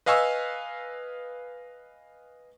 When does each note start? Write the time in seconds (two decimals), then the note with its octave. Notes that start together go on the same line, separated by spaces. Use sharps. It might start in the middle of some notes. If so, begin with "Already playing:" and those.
0.06 B4 D#5 F5 G#5 C#6 E6